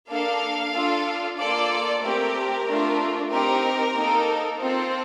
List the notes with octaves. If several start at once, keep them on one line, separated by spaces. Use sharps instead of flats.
A#3 D4 A4 F5
D4 F4 A4
A#3 F4 A4 D5
A3 C4 G4 A#4
A3 D4 F4
C4 D#4 G4 A#4
A#3 D#4 A4
C4 F4 A4 C5